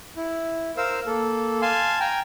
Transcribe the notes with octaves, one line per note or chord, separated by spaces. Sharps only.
E4
A#4 C5 F5 E6
A#3 A4
F5 G#5 A5 C6
G5 G#5 A#5